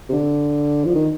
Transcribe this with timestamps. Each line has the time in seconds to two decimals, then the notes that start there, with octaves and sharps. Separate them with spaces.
0.09 C3
0.12 D3
0.85 F3
0.95 D#3